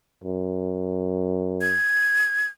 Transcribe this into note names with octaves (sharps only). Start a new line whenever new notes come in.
F#2
G#6